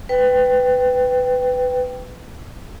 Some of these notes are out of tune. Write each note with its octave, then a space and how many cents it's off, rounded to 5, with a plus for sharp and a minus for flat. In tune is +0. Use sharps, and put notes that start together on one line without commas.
B4 +20 G5 +0